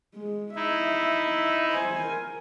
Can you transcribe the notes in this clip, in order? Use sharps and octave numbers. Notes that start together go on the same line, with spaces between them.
G#3
D#4 E4 E5
C5 G#5
A#4